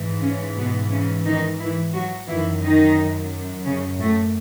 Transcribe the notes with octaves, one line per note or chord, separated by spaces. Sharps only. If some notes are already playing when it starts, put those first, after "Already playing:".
Already playing: G#2 E3
C#3 C#4
B2 B3
C#3 C#4
D#3 D#4
E3 E4
F#3 F#4
F#2 D#3 E3 E4
D#3 D#4
C#3 C#4
A2 A3